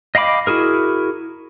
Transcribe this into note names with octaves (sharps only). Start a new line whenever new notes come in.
D#5 F5 G5 B5 D6
E4 F#4 G#4 A#4